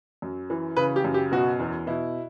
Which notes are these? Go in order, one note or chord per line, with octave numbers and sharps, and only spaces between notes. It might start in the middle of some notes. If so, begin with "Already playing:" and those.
F#2
E3
C#3 B4
G4
F#2
G4
B2 F#4
E2
B2 E4